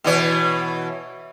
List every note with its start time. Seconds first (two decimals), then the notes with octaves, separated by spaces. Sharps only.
0.04 B2 E3 C#5